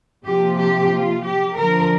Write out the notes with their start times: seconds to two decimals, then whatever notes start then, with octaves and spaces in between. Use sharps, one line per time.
0.25 C3 F3 A#3 F4 G4
0.58 G4
0.90 F4
1.23 G4
1.55 D3 F3 D4 A#4